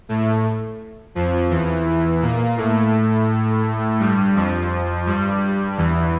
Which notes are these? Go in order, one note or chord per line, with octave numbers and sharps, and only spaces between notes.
A2 A3
F2 F3
E2 E3
A#2 A#3
A2 A3
G2 G3
F2 F3
G2 G3
E2 E3